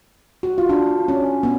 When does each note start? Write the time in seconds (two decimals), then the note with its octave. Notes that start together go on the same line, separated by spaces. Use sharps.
0.43 F#4
0.58 F4
0.69 D4
1.08 C#4
1.43 B3